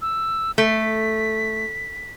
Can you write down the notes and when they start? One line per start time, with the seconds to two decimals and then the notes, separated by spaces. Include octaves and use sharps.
0.02 E6
0.58 A3 B6